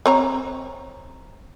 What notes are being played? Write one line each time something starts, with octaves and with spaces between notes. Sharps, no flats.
C4 C#5 A#5